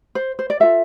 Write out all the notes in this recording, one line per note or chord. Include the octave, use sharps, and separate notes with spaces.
C5
C5
D5
F4 A4 E5